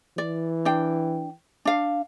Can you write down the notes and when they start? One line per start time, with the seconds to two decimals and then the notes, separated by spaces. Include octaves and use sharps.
0.18 E3 D5
0.65 D4 G5
1.65 D4 F5